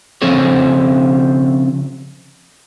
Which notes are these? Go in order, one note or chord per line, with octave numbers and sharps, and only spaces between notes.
C#3 F3 C4 A4 C5 C#5